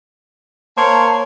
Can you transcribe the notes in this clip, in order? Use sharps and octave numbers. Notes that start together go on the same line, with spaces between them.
A#3 C5 C#5 A5